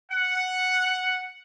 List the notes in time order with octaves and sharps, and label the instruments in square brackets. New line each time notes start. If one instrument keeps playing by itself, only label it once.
[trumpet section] F#5